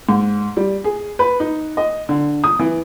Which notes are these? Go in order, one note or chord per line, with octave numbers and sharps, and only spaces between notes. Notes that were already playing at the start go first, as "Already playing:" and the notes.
G#2
G3
G#4
B4
D#4
D#5
D3
D#6
E3